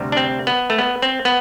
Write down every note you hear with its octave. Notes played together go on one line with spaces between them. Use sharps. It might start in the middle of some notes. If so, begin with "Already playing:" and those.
Already playing: D2 C3 G3
D4
C4
B3
A3
B3
C4
B3